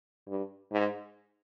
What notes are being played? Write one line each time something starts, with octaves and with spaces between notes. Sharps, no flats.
G2
G#2